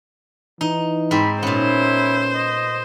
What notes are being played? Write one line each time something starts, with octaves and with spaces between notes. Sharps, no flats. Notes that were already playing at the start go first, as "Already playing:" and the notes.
E3 D#4
G#2 C4 B5
A#2 B3 C#4 E4 C5
D#5